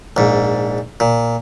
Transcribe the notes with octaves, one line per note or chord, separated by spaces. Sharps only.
A#1 G#2
A#2